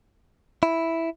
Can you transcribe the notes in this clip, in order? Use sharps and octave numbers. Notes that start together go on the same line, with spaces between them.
E4